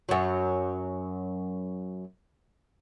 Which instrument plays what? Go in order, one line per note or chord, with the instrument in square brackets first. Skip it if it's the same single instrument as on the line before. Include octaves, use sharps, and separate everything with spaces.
[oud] F#2 F#3